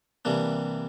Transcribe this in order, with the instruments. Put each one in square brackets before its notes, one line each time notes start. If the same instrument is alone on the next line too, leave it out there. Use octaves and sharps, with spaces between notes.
[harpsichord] C3 E3 G3 A#3 D4